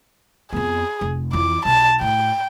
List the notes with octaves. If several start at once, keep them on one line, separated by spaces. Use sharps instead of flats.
F2 B3 G#4
F1
F2 E3 D6
B1 A5
A2 G5